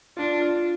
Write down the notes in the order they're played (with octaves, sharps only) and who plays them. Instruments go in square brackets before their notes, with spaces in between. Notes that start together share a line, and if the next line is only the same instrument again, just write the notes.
[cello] D4 [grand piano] F4
[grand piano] F4